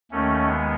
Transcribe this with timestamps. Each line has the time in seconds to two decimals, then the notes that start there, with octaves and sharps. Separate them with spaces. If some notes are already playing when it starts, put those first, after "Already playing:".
0.11 D#2 D#3 A3 C#4
0.47 G#3 B3